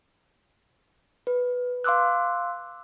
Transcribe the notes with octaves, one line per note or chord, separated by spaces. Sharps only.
B4
F5 C6 D6 E6 F#6